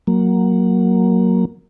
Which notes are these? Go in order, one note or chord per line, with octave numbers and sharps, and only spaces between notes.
F#3 A#3